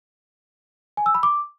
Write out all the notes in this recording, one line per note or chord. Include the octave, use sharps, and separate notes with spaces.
G#5
E6
B5
D6